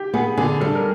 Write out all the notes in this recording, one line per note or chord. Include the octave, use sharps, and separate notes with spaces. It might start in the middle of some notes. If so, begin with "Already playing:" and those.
Already playing: G4
B3 G#4
D3 G#4
G3 A4
A#4